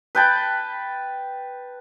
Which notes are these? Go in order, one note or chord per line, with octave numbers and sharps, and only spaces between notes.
B4 G5 A5